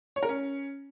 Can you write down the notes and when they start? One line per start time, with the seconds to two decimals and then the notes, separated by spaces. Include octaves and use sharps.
0.16 C#5
0.23 A#4
0.29 C#4